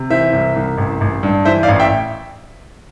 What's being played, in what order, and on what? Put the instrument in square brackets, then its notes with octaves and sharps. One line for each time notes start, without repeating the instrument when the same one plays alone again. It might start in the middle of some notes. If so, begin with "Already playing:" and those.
Already playing: [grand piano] C3
E3 C5 E5
C2
C2
A1
A1
G2
E3 C5 E5
D5 F5
A1
E5 G5